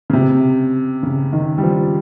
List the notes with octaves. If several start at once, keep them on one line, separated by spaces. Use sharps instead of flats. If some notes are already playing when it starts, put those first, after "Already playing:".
C#3
C3
C#3
D#3
G3
F3